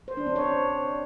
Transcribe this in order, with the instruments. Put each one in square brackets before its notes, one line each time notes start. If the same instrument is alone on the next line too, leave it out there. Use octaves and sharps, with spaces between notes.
[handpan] C5
D4
C4
C#5